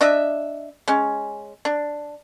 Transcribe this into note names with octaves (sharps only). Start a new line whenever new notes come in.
D4 D#5 E5
G#3 C#4
D4